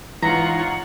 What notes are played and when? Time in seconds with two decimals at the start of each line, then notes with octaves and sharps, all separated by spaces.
0.22 G#2 E3 D#4 F4 C#5 F#5 A#5 C#6